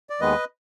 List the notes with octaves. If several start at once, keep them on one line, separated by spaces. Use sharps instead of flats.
D5
D#2 D#3 G#3 B3 B4 D#5